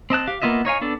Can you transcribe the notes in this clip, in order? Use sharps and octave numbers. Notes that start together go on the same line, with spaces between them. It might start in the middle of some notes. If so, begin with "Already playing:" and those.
C4 D#5 A5 F#6
G4 F5
A#3 B3 F4 D#5 E5
D#4 C#5 F5 G#5
B3 D4 A4